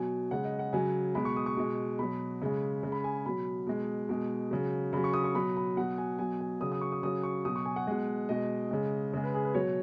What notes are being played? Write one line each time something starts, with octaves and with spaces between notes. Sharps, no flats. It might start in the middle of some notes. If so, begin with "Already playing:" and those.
Already playing: B2 F#3 G#5
C#3 G#3 F#5
D#5
F#5
C#3 F#3 G#5
B2 G#3 B5
C#6
D#6
C#6
B2 G#3
B2 F#3 B5
C#3 G#3
C#3 G#3
B5
G#5
B2 F#3 B5
B2 G#3
B2 G#3
C#3 F#3
C#3 F#3 B5
C#6
D#6
C#6
B2 F#3 B5
B5
B2 F#3 F#5
G#5
B2 F#3 G#5
G#5
C#3 F#3 D#6
D#6
C#6
D#6
C#3 F#3 D#6
C#6
B2 F#3 D#6
C#6
G#5
F#5
B2 G#3
B2 G#3 D#5
C#3 G#3
C#3 G#3
B4
G#4
B4
B2 F#3 C#5